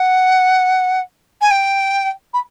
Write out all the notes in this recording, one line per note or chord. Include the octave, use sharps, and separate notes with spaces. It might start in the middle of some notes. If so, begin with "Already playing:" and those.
Already playing: F#5
G#5
G5
B5